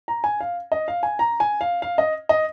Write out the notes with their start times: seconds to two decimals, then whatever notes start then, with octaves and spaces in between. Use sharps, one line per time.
0.08 A#5
0.24 G#5
0.41 F5
0.72 D#5
0.88 F5
1.03 G#5
1.19 A#5
1.40 G#5
1.61 F5
1.82 F5
1.98 D#5
2.29 D#5